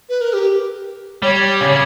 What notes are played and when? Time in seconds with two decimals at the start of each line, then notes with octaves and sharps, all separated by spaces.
0.09 B4
0.21 A#4
0.33 G4
1.22 G3 C#5
1.61 C#3